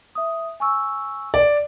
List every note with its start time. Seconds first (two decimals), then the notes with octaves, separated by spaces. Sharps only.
0.15 E5 D#6
0.60 G#5 C#6 E6
1.34 D5